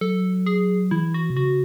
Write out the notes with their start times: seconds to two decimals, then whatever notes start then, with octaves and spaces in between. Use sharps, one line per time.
0.01 F#3 A4
0.46 G#4
0.91 E3 E4
1.14 F#4
1.30 C3
1.37 C#3 F#4